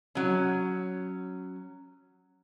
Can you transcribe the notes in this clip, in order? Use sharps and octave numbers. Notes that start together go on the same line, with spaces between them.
F#3 C#4